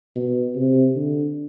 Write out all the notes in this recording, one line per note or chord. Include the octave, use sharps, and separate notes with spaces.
B2
C3
D3